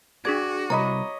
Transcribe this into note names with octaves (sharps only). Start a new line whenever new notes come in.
D4 F#4 G#4 D5 G#6
C2 C#5 D#5 A#5 B5